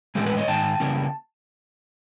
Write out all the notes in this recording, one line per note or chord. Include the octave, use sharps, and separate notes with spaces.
A2 E3 G#3 C#4 G4 A4
A4 B4
C#5 D#5
G#2 D#3 G#3 G5 A5
C#3 E3 G3 A#3 C#4